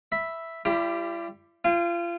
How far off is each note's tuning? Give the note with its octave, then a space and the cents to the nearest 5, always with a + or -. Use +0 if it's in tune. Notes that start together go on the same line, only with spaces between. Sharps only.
E5 +0 B5 +0
G3 +0 E4 +45 G4 +10
F4 -30 F5 -30 G#5 -45